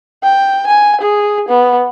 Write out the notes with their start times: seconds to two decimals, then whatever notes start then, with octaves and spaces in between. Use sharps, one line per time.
0.24 G5
0.67 G#5
1.01 G#4
1.49 B3